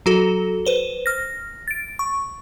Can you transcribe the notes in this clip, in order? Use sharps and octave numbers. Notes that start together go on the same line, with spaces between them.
F#3 F#4 A4
B4 C5 G7
F6 A#6
A6 D7
C#6